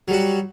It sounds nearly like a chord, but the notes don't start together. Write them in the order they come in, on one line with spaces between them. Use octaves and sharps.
F#3 G3 F#4